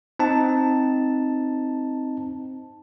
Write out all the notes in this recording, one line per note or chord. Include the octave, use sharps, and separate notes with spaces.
C4 D#4 A5